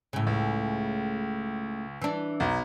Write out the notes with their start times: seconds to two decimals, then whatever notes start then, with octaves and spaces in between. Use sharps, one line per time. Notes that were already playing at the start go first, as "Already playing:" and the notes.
0.13 A2 C#3
0.27 C#2
2.02 E3 D4
2.40 B1